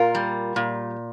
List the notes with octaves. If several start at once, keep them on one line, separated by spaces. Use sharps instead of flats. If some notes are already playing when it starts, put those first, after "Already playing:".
Already playing: A#2 F4 A#4
G3
A#2